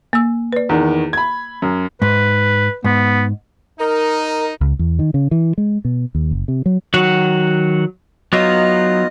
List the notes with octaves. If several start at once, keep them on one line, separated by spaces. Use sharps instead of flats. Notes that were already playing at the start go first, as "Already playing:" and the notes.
A#3 E6
B4 D5
E2 D#3
B5 G#6
F#2
G#2 B4
G#2 B3
D#4 A#4
C#2
E2
D#3
C#3
E3
G#3
B2
D#2
F#1
C3
F#3
D#3 F#3 F#4 F#5
F#3 B3 D#4 F4 D#5